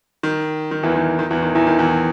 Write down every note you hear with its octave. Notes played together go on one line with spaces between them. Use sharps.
D#3
D#3
E2 E3
D#3
D#3
E2 E3
D#3
E2 E3
D#3
E2 E3